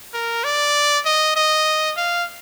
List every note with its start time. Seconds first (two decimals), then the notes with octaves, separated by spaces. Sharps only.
0.14 A#4
0.44 D5
1.05 D#5
1.36 D#5
1.97 F5